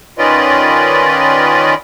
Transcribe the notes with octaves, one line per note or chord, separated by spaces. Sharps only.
D#3 C#4 F4 B4 D5 D#5